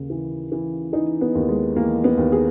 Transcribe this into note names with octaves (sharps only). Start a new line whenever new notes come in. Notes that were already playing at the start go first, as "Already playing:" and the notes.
Already playing: D#2 C#3
E3
E3
E3 D#4
B3
D#2
G#3
E3 A#3
B3
D#2
G#4